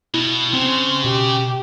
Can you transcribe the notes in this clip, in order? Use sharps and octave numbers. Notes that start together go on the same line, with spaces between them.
B2 E4
C#3 C4 C5
B2 G4